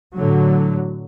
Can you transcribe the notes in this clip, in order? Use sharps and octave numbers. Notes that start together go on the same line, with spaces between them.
A2 D3 F#3